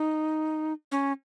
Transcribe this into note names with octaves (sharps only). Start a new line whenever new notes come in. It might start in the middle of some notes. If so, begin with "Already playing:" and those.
Already playing: D#4
C#4